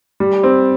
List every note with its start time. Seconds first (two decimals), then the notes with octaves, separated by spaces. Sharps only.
0.20 G3
0.43 C4